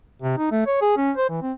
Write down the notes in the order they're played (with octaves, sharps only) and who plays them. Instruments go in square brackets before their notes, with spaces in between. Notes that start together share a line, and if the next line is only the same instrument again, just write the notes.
[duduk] C3
D#4
A3
C#5
G#4
C#4
C5
E3
C4